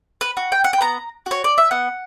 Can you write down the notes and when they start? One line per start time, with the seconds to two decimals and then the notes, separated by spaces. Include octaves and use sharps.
0.21 B4
0.37 F#4
0.52 G5
0.64 F#5
0.73 G5
0.81 B3 A#5
1.26 F#4 C#5
1.44 D5
1.58 E5
1.71 B3 F#5